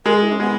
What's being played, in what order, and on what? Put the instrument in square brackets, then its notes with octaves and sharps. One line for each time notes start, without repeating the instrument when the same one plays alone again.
[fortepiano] G#3 [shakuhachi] A#4
[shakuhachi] G#4
E4
C#4
[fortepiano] G#3 [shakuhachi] B3